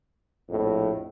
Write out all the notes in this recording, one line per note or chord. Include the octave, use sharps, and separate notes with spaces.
A#1 F2 A2